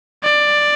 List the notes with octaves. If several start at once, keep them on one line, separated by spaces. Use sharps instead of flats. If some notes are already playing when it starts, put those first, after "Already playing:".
D5